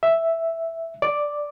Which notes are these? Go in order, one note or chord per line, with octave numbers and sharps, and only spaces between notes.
E5
D5